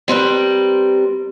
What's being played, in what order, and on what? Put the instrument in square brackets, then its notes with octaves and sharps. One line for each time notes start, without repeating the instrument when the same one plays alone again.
[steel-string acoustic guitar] G3 C4 A#4 B4